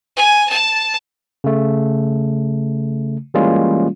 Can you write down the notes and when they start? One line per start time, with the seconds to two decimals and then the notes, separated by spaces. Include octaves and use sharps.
0.16 G#5
0.49 A5
1.44 C#3 A3
3.34 E3 G3 G#3 A#3 C#4 F4